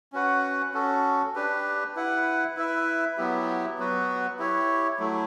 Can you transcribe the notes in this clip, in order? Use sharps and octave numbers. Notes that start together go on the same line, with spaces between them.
C#4 F#4 B4 F#5
C#4 F#4 A4
D4 G4 B4
E4 B4 F#5
E4 B4 E5
F#3 B3 E4 G4
F#3 B3 F#4 B4
E4 G4 C#5
F#3 A3 E4